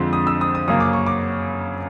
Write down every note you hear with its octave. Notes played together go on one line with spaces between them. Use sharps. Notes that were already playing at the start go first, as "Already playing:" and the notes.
Already playing: F2 D3 F3 G#3 C4 C6
D#6
E6
D#6
D#6
F#2 C#3 F#3 A#3 C#4 D#6
D6
C#6
D6